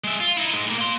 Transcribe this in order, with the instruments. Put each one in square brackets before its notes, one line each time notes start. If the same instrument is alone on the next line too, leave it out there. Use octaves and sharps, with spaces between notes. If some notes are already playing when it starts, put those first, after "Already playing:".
[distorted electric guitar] G#3 E5
F4
D#4 E4
G#2 G#3
A2 A#3
A#3 C6